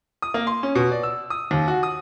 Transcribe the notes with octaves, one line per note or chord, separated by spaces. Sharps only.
D#6
A#3
C6
C#4
B2
D5
E6
D#6
D#2
F#4
D#6